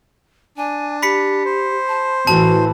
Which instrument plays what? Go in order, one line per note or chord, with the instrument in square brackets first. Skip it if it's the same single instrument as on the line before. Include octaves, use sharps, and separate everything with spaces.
[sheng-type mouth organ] D4 [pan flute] G#5
[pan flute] G4 [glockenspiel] B5 B6 C#7
[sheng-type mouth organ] C5
[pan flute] A5
[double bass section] A1 E3 [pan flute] F#4 [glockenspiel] A5